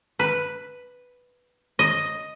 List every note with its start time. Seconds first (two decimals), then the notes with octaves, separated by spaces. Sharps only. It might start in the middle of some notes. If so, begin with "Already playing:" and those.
0.19 B4
1.79 D#5